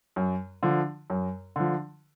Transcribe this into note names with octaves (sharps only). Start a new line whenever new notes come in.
F#2
D3 F3
F#2
D3 F3